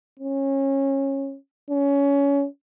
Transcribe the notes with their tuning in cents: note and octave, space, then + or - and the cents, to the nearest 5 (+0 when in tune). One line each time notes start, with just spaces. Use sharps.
C#4 -20
C#4 +20